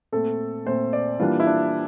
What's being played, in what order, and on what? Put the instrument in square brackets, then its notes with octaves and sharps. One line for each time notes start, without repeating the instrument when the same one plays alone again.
[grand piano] A#2 A3 C4 A4
A#2 A3 C4 C5
D5
E3 G3 A#3 D4 F4
E4
D4